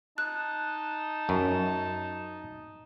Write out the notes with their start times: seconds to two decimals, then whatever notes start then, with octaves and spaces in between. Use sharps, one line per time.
0.18 D#4 A5 F#6
1.29 F#2